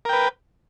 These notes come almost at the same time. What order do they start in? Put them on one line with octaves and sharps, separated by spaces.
A#4 G5 B4